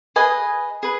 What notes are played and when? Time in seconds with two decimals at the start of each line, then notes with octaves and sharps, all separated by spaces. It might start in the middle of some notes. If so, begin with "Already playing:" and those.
0.16 G#4 B4 D#5 G#5
0.83 G#4 B4